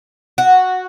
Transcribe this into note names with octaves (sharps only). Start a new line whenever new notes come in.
F#4